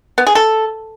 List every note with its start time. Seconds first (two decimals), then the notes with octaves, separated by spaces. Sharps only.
0.18 B3
0.27 G#4
0.35 A4